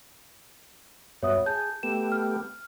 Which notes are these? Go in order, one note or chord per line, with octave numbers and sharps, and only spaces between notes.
G2 B3 F#4 C#5 E5 D#6
G#4 A5 G6
A3 B3 G4 E7
F6